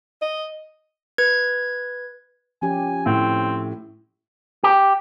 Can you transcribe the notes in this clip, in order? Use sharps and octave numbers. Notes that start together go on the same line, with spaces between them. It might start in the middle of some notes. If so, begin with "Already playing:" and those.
D#5
B4 G#6
F3 C#4 G4 G#5
A2 C4
G4